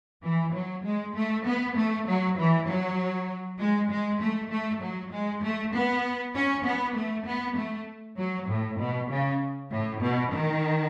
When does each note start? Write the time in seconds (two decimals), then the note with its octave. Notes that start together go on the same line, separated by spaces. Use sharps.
0.23 E3
0.53 F#3
0.83 G#3
1.15 A3
1.45 B3
1.76 A3
2.07 F#3
2.37 E3
2.67 F#3
3.58 G#3
3.90 G#3
4.21 A3
4.50 A3
4.81 F#3
5.11 G#3
5.42 A3
5.73 B3
6.34 C#4
6.64 B3
6.95 A3
7.26 B3
7.56 A3
8.17 F#3
8.48 A2
8.78 B2
9.10 C#3
9.71 A2
10.01 B2
10.31 D#3